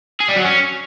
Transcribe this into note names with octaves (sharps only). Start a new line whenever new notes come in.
G#4
G3
F#3
C#4